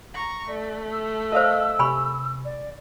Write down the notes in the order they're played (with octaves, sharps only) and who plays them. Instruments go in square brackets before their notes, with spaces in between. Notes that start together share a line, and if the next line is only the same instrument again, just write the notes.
[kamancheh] A#5 C#6
[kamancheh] A3 [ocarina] D5
[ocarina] E6
[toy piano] A#4 C5 [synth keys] D#5 F5
[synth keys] C3 [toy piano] G#5 B5 C#6
[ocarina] D5